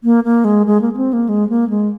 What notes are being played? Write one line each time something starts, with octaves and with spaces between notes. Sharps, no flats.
A#3
A#3
G#3
G#3
A#3
A#3
C4
A#3
G#3
A#3
G#3